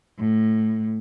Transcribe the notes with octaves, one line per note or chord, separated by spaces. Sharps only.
A2